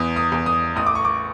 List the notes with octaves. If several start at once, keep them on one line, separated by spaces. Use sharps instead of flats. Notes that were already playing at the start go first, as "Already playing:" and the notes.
Already playing: E2 D#6
D#6
E2
D#6
A1 D#6
D6
C#6
D6